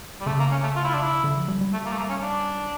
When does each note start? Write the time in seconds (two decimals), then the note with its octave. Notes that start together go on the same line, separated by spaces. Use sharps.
0.21 G3
0.26 C#3 A3
0.39 A#3
0.51 C#4
0.63 A3
0.76 F4
0.84 E4
0.94 D4
1.02 E4
1.24 D3
1.36 F3
1.48 G3
1.61 G3
1.73 A3
1.85 A#3
1.91 A3
1.97 A#3
2.09 C#4
2.21 D4